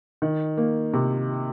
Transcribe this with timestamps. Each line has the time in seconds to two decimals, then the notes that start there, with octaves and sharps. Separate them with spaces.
0.22 D#3
0.57 A#3
0.93 C3